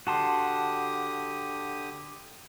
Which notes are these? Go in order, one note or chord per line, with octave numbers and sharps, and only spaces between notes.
D3 F#4 G4 A5 C6 D#6